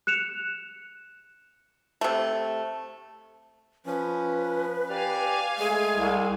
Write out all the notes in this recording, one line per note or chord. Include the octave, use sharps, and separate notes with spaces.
F#6 C#7 E7 F7
C3 A3
F3 C#4 B4
G4 D5 F5 G#5
G#3 A3 G#4
C2